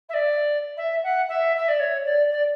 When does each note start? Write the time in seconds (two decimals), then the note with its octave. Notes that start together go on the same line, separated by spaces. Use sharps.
0.09 E5
0.13 D5
0.77 E5
1.03 F#5
1.28 E5
1.56 E5
1.68 D5
1.79 C#5
2.04 D5
2.30 D5